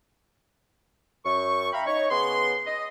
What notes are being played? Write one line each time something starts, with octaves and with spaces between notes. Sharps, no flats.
F#2 C#6
E5 F5 G5 A#5 B5
D#4 C#5 C#6
C#3 B3 G#4 C6
D#5